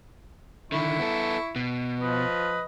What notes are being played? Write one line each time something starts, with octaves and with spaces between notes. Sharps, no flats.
D3 D#3 E4 C#6
B3 A4
B2
F3 B4 D#5